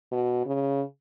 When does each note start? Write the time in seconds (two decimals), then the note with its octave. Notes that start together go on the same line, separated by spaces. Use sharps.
0.12 B2
0.46 C#3